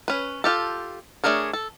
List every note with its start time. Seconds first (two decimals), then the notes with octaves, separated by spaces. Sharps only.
0.08 C#4 B4
0.44 F4 G4 A4
1.24 A3 D4 G#4 A#4 C#5
1.53 A4